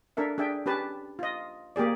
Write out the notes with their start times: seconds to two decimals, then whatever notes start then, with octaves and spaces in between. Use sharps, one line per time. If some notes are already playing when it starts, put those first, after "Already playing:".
0.17 D4 A4 A#4 E5
0.38 D4 G#4 E5 G5
0.66 C#4 G4 B4 A5
1.19 F4 D#5
1.76 A#3 G4 G#4 D5